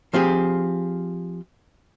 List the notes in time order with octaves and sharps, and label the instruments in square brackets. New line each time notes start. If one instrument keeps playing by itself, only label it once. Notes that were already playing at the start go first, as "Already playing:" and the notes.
[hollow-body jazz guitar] F3 C4 G4 G#4